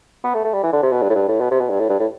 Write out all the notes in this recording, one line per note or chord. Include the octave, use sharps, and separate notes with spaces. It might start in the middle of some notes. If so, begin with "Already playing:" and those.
B3
A3
A3
G3
E3
D3
C3
B2
G2
A2
G2
A2
B2
C3
B2
G2
A2
G2
A2